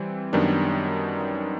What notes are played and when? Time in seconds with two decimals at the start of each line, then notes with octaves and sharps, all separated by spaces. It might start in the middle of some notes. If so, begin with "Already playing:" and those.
Already playing: E3 G3 C4
0.33 F#2 D#3 G3 B3 D4